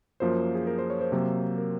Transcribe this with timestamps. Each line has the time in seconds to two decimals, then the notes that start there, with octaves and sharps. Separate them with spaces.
0.20 F#2 F3 A#3 C5
0.55 G#4
0.67 A#4
0.79 C5
0.90 C#5
1.01 C5
1.12 C3 F#3 A#3
1.58 A#4